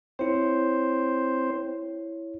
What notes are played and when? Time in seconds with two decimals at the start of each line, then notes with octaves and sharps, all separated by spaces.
0.19 C4 E4 C5 C#5